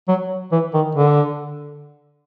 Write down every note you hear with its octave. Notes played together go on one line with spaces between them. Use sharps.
F#3
E3
D#3
D3